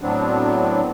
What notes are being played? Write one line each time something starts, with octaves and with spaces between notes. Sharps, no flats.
A2 F#3 B3 C4 D4